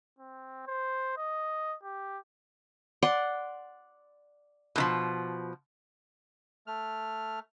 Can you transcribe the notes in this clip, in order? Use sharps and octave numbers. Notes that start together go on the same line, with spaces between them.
C4
C5
D#5
G4
D5 F#5 C6
B2 D#3 F3
A3 F6